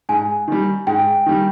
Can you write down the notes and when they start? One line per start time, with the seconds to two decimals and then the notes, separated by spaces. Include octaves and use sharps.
0.09 G#2 G#5
0.48 D#3 G3
0.87 G#2 G5
1.26 D#3 G3